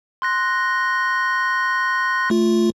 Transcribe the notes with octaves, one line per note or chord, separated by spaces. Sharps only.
C6 F#6 A#6
A3 F4